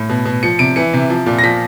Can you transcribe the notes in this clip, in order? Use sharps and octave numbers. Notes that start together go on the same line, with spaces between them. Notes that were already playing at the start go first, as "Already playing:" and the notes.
Already playing: A2
B2
B2
F3 C#7
C3 D7
E3 C#7
C3
F3
A#2
A#6
F3 B6